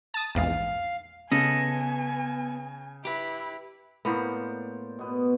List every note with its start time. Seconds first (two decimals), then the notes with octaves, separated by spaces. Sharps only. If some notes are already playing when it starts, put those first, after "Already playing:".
0.14 A5 D#6 A6
0.35 A#1 E2 G#2 F5
1.32 C#3 B3 A4 D#5 G#5
3.05 E4 G4 B4
4.05 A2 A#3 B3 C5 D5
4.99 B2 B3